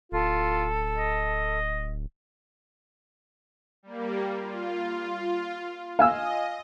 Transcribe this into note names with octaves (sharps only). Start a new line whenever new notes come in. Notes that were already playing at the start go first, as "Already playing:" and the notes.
D1 F4 A4
D#5
G3 A#3
F4
D#5 F5 G#5 E6